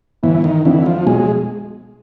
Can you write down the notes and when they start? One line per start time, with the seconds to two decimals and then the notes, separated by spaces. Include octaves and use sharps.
0.23 G1 E3
0.44 D#3
0.65 F2 D3 E3
0.86 F3
1.06 B1 G#3